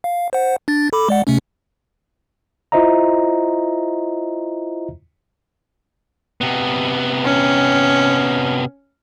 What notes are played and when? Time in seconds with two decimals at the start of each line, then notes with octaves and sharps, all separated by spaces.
0.04 F5
0.33 C5 F#5
0.68 D4 A6
0.93 A4 B5 D6
1.09 G#3 D5 F#5
1.27 C3 A3 C#4
2.72 E4 F4 C5 D#5 E5 A#5
6.41 C3 B3
7.25 C#4